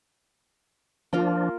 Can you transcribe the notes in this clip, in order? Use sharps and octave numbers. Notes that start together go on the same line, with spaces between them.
F3 A#3 D4 F4 A#4